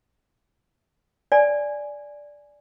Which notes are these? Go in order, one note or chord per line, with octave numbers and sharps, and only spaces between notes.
D5 G#5